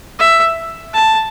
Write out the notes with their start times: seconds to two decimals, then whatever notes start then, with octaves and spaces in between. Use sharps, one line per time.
0.19 E5
0.94 A5